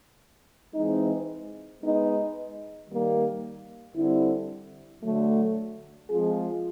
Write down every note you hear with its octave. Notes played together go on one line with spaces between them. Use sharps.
E3 G#3 C4 D#4
G#3 B3 D#4
D#3 G3 A#3
D3 G3 C4 E4
D3 F#3 A3
F3 G#3 C4 F4 G#4